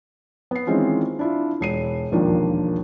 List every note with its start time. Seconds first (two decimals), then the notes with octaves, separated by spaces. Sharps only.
0.51 B3 C7
0.67 D#3 E3 G#3 C4 C#4 F4
1.19 D4 E4 F4
1.61 E1 C7 D#7
2.11 E1 A#1 D#2 F3 A#3 D4